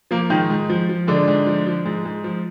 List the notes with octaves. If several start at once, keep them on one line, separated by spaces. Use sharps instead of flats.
F3 A#3
G#2 D#3 D#4
G#2
F3
F3
G#2 D3 D4
G#2
F3
F3
G#2
G#2
F3